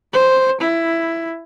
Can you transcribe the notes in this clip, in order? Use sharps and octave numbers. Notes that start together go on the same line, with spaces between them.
C5
E4